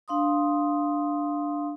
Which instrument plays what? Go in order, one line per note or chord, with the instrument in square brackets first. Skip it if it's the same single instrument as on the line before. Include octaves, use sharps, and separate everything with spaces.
[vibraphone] D4 F5 C6 D#6